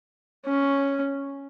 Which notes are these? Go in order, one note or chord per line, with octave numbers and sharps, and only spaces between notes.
C#4